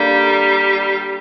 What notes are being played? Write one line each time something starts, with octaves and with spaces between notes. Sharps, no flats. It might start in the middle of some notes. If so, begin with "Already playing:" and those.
Already playing: D3 G3 A#3